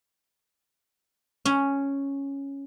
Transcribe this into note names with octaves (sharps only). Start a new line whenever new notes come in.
C#4